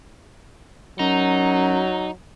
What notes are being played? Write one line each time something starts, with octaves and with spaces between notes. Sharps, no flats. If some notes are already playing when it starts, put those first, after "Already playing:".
F#2 F#3 D#4